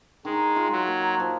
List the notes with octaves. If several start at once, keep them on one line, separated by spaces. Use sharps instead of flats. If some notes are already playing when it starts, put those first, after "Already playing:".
D#3 G#3
F4
F#3
A#3
F3